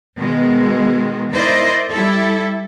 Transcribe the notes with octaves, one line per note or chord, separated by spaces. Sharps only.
B2 D#3 G#3
D#4 E4 A#4 C5 D5 D#5
G3 E4 A4